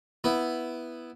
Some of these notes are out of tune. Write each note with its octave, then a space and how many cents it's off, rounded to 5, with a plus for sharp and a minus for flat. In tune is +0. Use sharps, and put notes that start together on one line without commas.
B3 +0 E4 +0